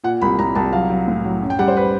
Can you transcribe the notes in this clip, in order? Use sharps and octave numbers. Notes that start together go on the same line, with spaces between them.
A#2 F#5
C2 B5
C2 A#5
C2 A5
F#3 F5
F#3
A2
F#3
F#2
G5
G3 F#5
C5
B4